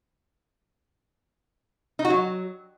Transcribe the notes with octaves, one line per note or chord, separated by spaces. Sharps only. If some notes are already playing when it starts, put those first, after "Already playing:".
D#4
F#4
F#3